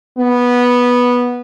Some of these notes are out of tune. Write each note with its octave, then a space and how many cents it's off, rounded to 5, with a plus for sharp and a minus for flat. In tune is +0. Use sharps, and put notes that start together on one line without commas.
B3 -10